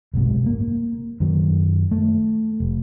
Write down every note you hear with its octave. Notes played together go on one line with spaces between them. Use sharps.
F#1 B1 G#2 C3
A#3
F#2 D#3 F#3
A3
F1